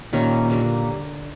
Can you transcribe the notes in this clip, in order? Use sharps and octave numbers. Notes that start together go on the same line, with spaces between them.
A#2 D#3 G3 A#3 C#4
D3 G3 A#3